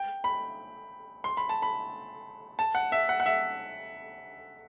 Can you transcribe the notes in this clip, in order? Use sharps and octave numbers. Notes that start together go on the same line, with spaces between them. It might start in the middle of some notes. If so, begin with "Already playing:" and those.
Already playing: G5
B5
C6
B5
A5
B5
A5
F#5
E5
F#5
F#5
E5